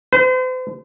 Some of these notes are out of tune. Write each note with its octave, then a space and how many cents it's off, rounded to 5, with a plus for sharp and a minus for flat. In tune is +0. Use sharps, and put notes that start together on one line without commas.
C5 -40